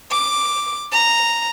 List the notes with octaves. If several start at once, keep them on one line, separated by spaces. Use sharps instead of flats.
D6
A#5